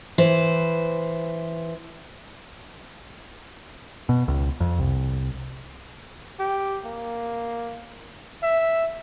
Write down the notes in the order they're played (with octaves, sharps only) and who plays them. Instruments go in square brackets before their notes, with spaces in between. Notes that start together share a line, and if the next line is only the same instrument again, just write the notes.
[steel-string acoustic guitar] E3 B4 C5
[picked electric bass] B2
C#2
F2
C2
[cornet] G4
A#3
E5